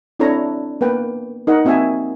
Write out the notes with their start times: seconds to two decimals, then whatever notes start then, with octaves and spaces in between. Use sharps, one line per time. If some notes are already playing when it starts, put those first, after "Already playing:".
0.20 C4 D4 E4 A4 C#5 A#5
0.81 A#3 B3 B4 G5
1.47 D#4 A#4 D#5 F#5
1.65 A#3 C4 F#4 E5 G5 G#5